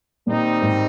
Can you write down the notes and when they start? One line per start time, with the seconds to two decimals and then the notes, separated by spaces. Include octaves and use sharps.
0.27 A#2 D#3 G3 C4 D#4
0.62 G#2